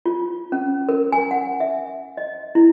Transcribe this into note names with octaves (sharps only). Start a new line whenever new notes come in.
F4
C#4
A#4
G#5
F#5
E5
D#5
E4